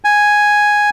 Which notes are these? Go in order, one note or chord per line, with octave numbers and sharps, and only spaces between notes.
G#5